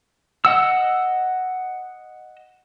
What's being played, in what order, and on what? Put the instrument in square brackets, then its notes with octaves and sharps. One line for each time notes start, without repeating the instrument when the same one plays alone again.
[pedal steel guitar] D#5 F#5 E6